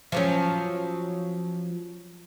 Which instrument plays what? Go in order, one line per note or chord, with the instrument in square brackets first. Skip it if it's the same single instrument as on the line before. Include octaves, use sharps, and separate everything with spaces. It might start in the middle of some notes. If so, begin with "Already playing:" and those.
[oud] F3 F#3 C#4